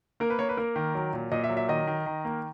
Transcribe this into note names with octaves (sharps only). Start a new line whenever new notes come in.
A#3 A#4
B4
A#3 C#5
B4
A#3 A#4
D#3
F#3
A#2
A#2 D#5
E5
F#3
E5
D#3 D#5
D#3
D#3
A#3